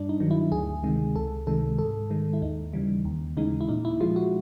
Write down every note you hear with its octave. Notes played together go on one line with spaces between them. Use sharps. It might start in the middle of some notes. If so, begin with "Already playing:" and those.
Already playing: G2 D4
D#4
D#3 F#3
E4
D2 G#4
C3 D#3 G#3
C#2 A4
C3 D#3 G#3 A4
G#2 A4
D#3 G#3
E4
D#2 D#4
C#3 E3 G3
D#2
C#3 E3 G#3 D#4
E4
A#2 D#4
E4
F3 G#3 F4
F#4